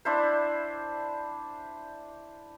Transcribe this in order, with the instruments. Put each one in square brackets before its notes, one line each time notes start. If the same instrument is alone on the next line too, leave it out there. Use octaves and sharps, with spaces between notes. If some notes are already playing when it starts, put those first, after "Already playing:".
[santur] D4 E4 C5